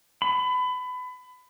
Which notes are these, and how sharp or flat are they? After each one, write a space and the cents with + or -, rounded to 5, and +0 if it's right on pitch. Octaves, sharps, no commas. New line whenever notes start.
B5 +25